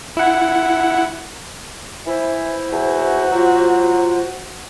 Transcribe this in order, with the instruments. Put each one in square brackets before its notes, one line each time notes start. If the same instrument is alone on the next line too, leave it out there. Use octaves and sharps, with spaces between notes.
[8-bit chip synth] E4 F#5
[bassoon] E3 [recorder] E4 [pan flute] C5
[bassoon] E2 [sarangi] F#4
[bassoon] F#3 [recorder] F4